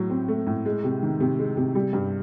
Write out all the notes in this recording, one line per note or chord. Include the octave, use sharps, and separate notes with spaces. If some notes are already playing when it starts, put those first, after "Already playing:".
Already playing: A2 F#3
C4
A3
A2
G#3
C3
D#3
C3
G#3
C3
G3
G2